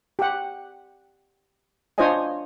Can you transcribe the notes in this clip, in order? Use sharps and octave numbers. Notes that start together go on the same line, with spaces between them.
G4 F#5
D4 F4 C5 C#5 D#5 G#5